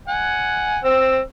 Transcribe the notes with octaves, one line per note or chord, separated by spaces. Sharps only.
F#5 G#5
C4 E6